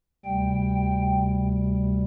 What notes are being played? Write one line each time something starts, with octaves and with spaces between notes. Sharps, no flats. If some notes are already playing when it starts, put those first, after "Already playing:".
D2 C3 G3 G5